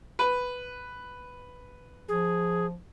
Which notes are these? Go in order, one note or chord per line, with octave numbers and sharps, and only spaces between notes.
B4
F3 G#4